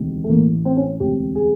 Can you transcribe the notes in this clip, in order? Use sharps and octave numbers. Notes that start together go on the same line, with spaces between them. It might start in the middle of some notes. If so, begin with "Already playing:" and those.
Already playing: E1 D2 C3 D#3
A3
A1 A2 E3 A#3
C4
C#4
E1 D2 C3 G4
G#4